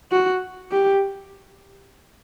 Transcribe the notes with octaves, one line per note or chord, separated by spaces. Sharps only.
F#4
G4